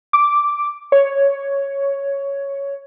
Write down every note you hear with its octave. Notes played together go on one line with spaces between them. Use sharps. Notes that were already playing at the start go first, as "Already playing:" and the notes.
D6
C#5